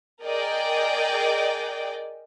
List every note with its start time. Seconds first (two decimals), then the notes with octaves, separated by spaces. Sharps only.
0.24 G#4 A#4 D5 D#5 G5